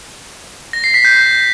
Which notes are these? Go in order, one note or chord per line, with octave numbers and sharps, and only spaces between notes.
A#6
C7
B6
G6